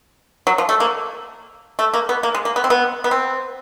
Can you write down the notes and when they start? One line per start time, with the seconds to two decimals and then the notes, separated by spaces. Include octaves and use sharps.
0.47 F#3
0.58 F3
0.69 A3
0.80 A#3
1.79 A3
1.94 A#3
2.09 B3
2.23 A#3
2.34 G#3
2.45 A#3
2.56 B3
2.64 C4
2.70 B3
3.04 B3
3.11 C4